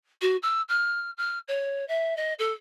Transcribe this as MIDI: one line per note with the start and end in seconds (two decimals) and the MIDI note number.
0.22 0.37 66
0.42 0.61 88
0.69 1.11 89
1.17 1.39 89
1.48 1.87 73
1.88 2.16 76
2.17 2.34 75
2.39 2.53 69